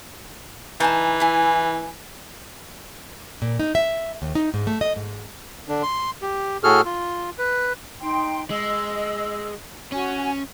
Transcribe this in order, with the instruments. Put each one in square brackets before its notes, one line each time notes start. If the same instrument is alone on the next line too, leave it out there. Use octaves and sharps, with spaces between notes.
[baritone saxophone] E3 [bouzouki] D#4 G#5 A5
[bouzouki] E4 G#5
[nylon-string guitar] A#2
D#4
E5
D#2
D#4
G#2
A3
D#5
G#2
[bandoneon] D3 D4
C6
G4
A2 F#4 G#4 A4 F6
F4
B4
[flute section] D#4 G5 C6
[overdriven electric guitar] G#3 [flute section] D#5 E6
[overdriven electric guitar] C#4 [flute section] F#4 G#5